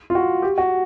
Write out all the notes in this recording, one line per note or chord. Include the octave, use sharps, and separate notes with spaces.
F4
F#4
G4
F#4